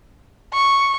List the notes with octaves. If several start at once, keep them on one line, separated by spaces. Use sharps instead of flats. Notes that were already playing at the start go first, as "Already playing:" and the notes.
C#6